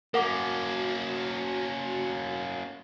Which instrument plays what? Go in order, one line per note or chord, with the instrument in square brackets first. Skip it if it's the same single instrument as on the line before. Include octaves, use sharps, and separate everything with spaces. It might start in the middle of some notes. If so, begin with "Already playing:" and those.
[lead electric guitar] A#3 C#4 [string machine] F#4 A5 [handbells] A#4 F#5 D6